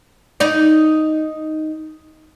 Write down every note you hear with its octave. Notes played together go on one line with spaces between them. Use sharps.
D#4 D5